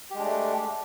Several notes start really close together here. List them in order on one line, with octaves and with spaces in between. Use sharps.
G4 G#3 D4 A3